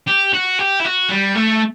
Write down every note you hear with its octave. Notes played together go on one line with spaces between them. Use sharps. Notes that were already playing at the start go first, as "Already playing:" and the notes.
G4
F#4
G4
E4
F#4
G3
A3